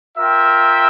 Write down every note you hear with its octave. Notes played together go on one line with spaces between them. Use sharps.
F4 A#4 E5 G5